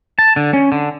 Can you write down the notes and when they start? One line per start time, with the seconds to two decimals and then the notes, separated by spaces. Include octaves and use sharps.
0.19 A5
0.36 D3
0.53 C#4
0.72 D3